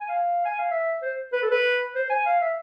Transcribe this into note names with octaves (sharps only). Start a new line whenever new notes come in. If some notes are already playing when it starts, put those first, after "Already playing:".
G#5
F5
G#5
F5
E5
C5
B4
A4
B4
C5
G#5
F5
E5